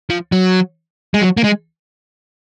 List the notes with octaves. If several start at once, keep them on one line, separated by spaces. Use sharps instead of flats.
F3
F#3
G#3
F#3
A#3
G#3